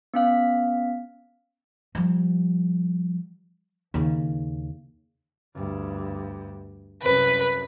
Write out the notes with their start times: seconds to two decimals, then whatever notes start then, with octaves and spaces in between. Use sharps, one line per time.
0.14 B3 C#4 F5
1.95 F3 G3
3.94 D#2 C#3
5.55 D2 G2
7.02 C2 F#2 B4